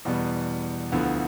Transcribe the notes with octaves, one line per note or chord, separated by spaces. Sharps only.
E2 B2 G3 B3
D2 D3 F3 B3 E4